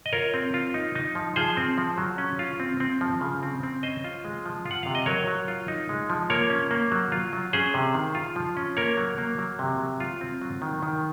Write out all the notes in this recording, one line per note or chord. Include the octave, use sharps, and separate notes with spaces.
D#5
F4 A#4 C#5
C4
F4
D#4
D#4
F3
F3 G#4 C5
C4
F3
F#3
C#4
F4
C4
C4
F3
C#3
C4
C4
C#4 C5 D#5
F4
G#3
F3
F4
F#5
C3 F5
D#5
F#3 A#4 C#5
F#3
F4
D#4
G#3
F3
A#3 A#4 C#5
C#4
A#3
F#3
F4
F#3
C#4 G#4 C5
C3
D#3
F4
F3
C#4
A#3 A#4 C#5
F#3
A#3
F#3
C3
F#3
F4
C4
F#3
D#3
D#3